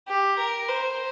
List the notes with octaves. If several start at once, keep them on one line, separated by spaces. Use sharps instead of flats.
G4
A#4
C5